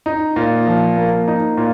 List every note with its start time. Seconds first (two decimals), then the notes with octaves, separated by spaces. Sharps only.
0.06 D#4
0.36 A#2
0.67 F3
0.97 A#3
1.28 D#4
1.57 A#2